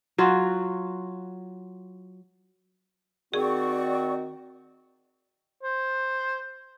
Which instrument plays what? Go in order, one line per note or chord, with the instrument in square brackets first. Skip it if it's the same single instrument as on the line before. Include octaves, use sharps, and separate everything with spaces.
[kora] F#3 F4 F#4
[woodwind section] D#3 C4 [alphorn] F#4 [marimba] G#4 [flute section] D5 C#6
[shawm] C5